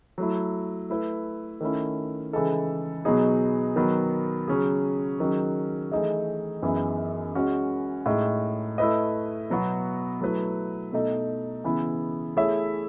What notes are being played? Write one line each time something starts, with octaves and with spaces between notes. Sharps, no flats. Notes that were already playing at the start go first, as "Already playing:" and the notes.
F#3 A3 E4
A3 E4 B4
D#3 A3 C#4 E4
C#3 E3 G#3 D#4 A4
B2 F#3 B3 D#4 G#4
D#3 F#3 B3
C#3 F#3 C#4 G#4
D#3 F#3 C#4 G#4
E3 A3 D#4 G#4 D#5
F#2 E3 B3 D#4 G#4
G#3 C#4 F#4
A2 G#3 D#4
A3 E4 B4 D#5
B2 F#3 B3 F#4
F#3 A3 E4 B4
B2 A3 D#4 A4 D#5
C#3 E3 B3 E4 G#4
A3 E4 G#4 C#5 E5